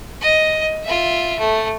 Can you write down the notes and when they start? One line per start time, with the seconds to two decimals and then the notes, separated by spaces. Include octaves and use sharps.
0.21 D#5
0.83 F4 E5
1.39 A3